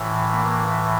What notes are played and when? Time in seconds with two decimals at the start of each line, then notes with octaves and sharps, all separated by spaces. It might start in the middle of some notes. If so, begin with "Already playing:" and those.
Already playing: A2 E3
0.32 A#3